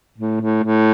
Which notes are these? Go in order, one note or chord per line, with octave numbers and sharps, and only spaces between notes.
A2
A2
A2